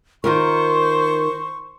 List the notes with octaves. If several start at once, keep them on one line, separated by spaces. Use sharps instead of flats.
D#3 F4 A#4 C5 C#6